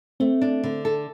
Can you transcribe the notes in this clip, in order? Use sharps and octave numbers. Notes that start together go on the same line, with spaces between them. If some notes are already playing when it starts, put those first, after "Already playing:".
A3 C4
D4
D3
A4